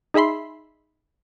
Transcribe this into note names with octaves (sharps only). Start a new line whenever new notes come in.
D#4 G#4 E5 B5 C6